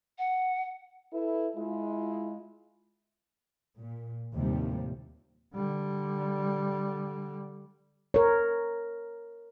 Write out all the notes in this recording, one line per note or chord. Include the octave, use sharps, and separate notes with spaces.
F#5
E4 A4 B4
G#3 E4 F4
A#2
D#2 A2 C3 F3 G3
D3 G3
A#4 C#5